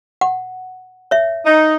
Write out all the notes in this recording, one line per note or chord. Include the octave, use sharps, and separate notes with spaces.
F#5
C#5 E5
D#4